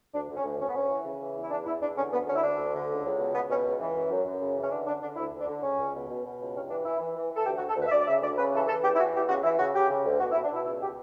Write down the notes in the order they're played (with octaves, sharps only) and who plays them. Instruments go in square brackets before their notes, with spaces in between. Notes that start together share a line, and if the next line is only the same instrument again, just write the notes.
[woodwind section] D2 D4
D2
C#4
D2
D2 C#4
B3
D2 C#4
E3
C#3
E3
E2
E4
E2 D4
E2 E4
E2 D4
D3 C#4
D2 B3
D3 C#4
E4
D2 D4
D2
D3
C#2
C#2
B2
C#2 B3
B2 C#4
C#2
E3
F#2
F#2
F#2
C#3
E3
C#4
D3 D4
D3 D4
D3 D4
D2 E4
D2
D4
D3
C#2 C#4
C#2
B2
B2
B2
C#2
G2 C#4
E3 D4
E3 E4
E3
E3
E3 A4
D2 G4
F#4
D2
A4
D2 B4
E5
D2 D5
D5
C#3 E5
D2 D5
C#3 B4
E3 A4
E3 A4
E2 G4
E4
E3 F#4
E2 G4
C#3 F#4
E3 E4
C#3 F#4
C#3 G4
C#3
D2
B2 F#4
E4
B2
D4
B2 E4
C#2 E4
B2 G4